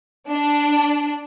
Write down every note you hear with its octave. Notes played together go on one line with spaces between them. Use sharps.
D4